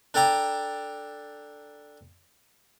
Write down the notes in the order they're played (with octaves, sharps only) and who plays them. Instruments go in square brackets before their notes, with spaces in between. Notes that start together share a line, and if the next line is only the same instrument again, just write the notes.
[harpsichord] D4 A4 G5 A#5 D6